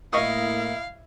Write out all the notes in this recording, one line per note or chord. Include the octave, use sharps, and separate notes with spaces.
A2 A#3 E4 D#5 F5 C#6 D#6